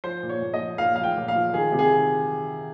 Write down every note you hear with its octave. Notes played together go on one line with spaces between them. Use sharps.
F3 C5
A#2
C#5
A#2
D#5
F3
A#2 F5
F3 F5
G5
A#2
F5
F3
D#3 G#4
C3
G#4
D#3